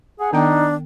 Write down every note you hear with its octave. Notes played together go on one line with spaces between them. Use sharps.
G#4 F#5
D#3 B3 D4 D#4 G5